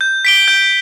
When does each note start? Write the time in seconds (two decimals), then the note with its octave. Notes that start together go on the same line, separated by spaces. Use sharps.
0.01 G6
0.25 B6 D7 G7
0.48 G6